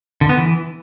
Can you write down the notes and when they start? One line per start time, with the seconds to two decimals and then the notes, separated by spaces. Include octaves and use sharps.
0.21 D3
0.29 B3
0.37 E3